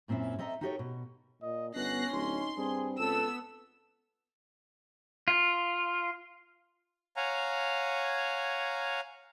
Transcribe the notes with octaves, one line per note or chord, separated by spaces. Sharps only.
F#2 A#2 C4 C#4 E4
C4 A4 D#5 E5 A#5
D#4 F#4 G4 A4 A#4 C#5
B2
A#2 D#5
G1 B3 C#4 F#6 A#6 C7
D1 D#4 C6
G2 C4 G#4
C#2 B3 A4 E6
F4
C#5 F5 F#5 G#5 A#5